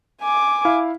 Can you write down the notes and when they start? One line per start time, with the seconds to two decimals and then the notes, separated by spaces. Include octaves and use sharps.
0.22 G#5 D6
0.65 E4 F5